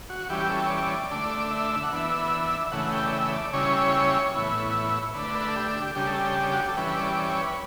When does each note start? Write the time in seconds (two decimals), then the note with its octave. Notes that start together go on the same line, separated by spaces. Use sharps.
0.10 F#4
0.29 E3 G3 C#4 G4
0.50 A4
0.66 C#5
0.70 D5
1.11 D3 A3 D4
1.51 E5
1.71 E5
1.83 F#5
1.92 E3 B3 D4 E5
2.72 C#3 E3 A3 F#5
2.93 G5
3.06 D5
3.13 E5
3.32 D5
3.53 C#3 G3 C#4 E4 C#5
4.34 A2 E3 B3 E4
5.14 D3 A3 D4 B4
5.34 B4
5.48 A4
5.56 G4
5.82 G4
5.95 C#3 G3 D4 G4
6.07 A4
6.18 G4
6.53 F#4
6.61 G4
6.68 A4
6.77 E3 G3 C#4 B4
6.97 D5
7.17 D5
7.29 C#5
7.41 B4